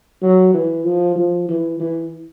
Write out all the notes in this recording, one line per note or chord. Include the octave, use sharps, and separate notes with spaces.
F#3
E3
F3
F3
E3
E3